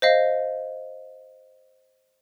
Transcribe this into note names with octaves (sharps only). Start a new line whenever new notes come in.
C5 D#5 F5